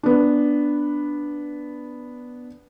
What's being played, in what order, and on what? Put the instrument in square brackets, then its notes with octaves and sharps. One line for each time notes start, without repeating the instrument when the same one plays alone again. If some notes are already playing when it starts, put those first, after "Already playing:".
[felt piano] B3 D4